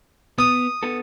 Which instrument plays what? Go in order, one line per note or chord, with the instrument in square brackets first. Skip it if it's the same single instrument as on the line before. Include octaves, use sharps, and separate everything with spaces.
[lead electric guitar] B3 [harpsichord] D#6
[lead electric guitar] B3 A4